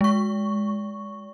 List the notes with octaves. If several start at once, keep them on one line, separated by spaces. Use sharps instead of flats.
G#3 C#6